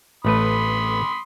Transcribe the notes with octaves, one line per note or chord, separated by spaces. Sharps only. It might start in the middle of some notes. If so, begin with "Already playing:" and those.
A1 A3 B4 B5 C6 D#6